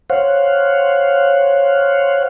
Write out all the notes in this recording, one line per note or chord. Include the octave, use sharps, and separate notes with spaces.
C5 C#5 F5 F#5